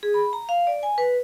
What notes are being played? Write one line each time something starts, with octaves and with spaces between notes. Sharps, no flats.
G#4
B5
A#5
F5
D5
G#5
B4